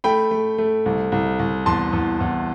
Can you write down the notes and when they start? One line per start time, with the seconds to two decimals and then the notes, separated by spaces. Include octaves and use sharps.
0.04 A3 G5 B5
0.31 A3
0.58 A3
0.86 C2
1.12 C2
1.39 C2
1.66 E2 A5 C6
1.93 E2
2.20 E2